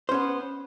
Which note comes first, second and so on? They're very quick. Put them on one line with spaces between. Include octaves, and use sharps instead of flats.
C5 C#4 B3